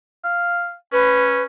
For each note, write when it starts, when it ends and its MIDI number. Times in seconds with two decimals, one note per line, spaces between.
0.24 0.74 77
0.92 1.45 61
0.92 1.43 71